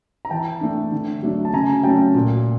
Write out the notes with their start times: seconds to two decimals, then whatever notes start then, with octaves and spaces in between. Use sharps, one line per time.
0.25 A#5
0.30 E3 G5 A5
0.61 A3 D4
0.92 D3
1.22 F#3 A3 D4
1.45 A5
1.53 C#3 G#5 A#5
1.84 F#3 A3 C#4 G5 A5
2.15 A#2